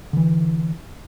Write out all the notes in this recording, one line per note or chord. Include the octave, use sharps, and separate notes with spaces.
D3 E3